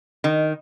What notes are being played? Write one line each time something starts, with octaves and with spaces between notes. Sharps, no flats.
D#3